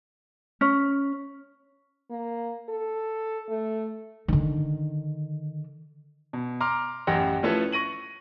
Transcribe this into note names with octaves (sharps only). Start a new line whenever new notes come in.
C#4
A#3
A4
A3
D3 D#3
B2
A#5 C6 D6 F6
A1 F#2 G4 F#5 G5 A#6
F3 A3 C#4 E4 A4 B4
C#6 A#6 D#7 F#7